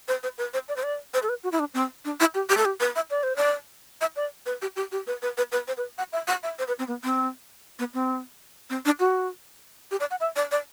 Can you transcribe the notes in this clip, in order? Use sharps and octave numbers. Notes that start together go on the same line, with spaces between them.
C5
C5
B4
C5
D5
C5
D5
C5
A4
B4
F#4
E4
D4
C4
D4
E4
G4
G4
A4
G4
B4
E5
D5
C5
D5
E5
D5
B4
G4
G4
G4
B4
B4
B4
B4
C5
B4
F#5
E5
F#5
E5
C5
B4
C4
B3
C4
B3
C4
C4
D4
F#4
G4
D5
F#5
E5
D5
D5